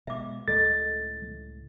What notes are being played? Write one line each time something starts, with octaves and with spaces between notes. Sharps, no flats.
B2 G#3 E5 F5 D6
C#2 A2 A4 D#5 A6